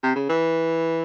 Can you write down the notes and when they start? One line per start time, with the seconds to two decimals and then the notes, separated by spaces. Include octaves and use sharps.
0.03 C3
0.15 C#3
0.29 E3